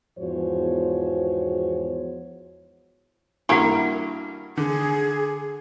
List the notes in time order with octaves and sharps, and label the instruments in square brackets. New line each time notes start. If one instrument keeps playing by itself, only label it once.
[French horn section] E2 G#2 F3 F#4 C5 C#5
[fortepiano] G2 A#3 [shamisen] E4 F#4 A#4 [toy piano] G4 F#5
[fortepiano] D3 [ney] G#4